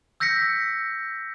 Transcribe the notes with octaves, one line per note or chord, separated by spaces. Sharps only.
E6 G6 A#6 B6 C#7